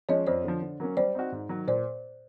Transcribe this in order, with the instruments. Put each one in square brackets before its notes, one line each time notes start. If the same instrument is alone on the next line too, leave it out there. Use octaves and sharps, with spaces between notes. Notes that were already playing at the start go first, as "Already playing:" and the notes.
[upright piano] F3 G#3 C#4 [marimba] C#5 D#5
[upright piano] F2 [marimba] C5 D5
[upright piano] D3 F3
D3
F#3 A#3 C#4
[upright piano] G3 [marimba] C5 D5
[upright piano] C4 D#4 F#4
G#2
D#3 F#3
[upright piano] A#2 [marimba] C5 D5